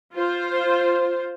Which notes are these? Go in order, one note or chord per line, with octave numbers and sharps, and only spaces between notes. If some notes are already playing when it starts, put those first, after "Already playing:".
F4 C5